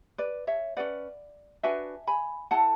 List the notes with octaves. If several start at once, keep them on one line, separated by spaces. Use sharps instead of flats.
B4 D5
C#5 E5
C#4 G#4 B4 D5 F#5
D4 F#4 B4 E5 G#5
G#5 B5
E4 A4 F#5 A5